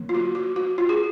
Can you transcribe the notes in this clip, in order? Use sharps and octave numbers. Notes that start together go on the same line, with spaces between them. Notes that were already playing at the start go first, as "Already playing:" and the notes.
Already playing: D3 F#3 A#3
F4
F#4
F#4
F#4
F4
G#4